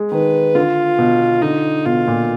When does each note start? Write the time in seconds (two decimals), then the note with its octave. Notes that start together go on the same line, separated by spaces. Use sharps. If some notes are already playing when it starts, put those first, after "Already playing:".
Already playing: G#3
0.12 D#3 B4
0.55 D3 F4
0.99 B2
1.42 D3 D#4
1.86 B2 F4
2.07 A#2